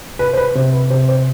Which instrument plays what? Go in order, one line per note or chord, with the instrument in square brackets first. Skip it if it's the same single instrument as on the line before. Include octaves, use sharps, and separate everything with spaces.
[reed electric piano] C2 [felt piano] B4
[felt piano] C5
B4
[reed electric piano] C3 [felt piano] C5
[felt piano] B4
[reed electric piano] C3 [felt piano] C5
[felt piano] C5